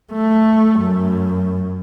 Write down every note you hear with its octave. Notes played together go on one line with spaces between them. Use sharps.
A3
F#2